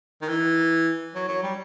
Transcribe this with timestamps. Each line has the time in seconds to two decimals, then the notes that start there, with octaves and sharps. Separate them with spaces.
0.22 D#3
0.29 E3
1.15 F#3
1.28 F#3
1.43 G3